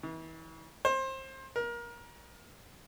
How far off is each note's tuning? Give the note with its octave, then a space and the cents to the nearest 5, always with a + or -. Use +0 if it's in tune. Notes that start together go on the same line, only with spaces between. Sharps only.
E3 -35
C5 +25
A#4 +25